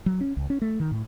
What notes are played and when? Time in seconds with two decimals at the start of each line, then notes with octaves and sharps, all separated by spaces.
0.06 F#3
0.21 C#4
0.37 C#2
0.50 C#4
0.62 A3
0.80 D#3
0.91 A2